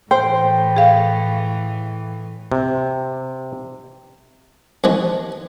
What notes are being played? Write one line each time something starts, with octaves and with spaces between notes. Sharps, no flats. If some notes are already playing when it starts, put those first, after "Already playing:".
A2 E3 C5 G5
G#4 F5
C3
C2 D#3 F3 G#3